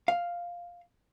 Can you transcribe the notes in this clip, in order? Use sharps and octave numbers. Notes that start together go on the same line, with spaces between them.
F5